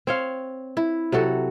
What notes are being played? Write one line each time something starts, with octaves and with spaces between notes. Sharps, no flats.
C4 C#5 F5
E4
C3 F#3 F#4 A4